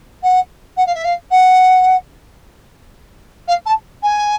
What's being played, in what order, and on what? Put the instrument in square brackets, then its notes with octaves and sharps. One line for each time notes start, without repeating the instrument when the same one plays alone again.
[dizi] F#5
F#5
F5
E5
F5
F#5
F5
A5
G#5